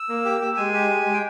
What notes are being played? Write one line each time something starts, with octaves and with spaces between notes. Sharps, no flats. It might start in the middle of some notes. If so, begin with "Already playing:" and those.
Already playing: E6
A#3
G4
G4
G#3 G#5
G4
G#3
G#3
G5